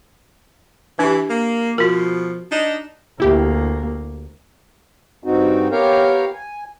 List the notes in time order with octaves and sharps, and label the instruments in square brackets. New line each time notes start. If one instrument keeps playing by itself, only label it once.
[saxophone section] E3 [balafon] D4 G4
[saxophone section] A#3
[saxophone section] B2 F3 [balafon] F#4 A#4
[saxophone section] D4 D#4
[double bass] D2 A#3 [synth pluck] E4 G4
[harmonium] G2 C4 D#4 F#4
B3 G4 A#4 C#5 F5 G5
G#5